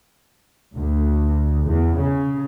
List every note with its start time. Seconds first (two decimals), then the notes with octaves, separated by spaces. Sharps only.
0.76 D2
1.68 E2
1.99 C#3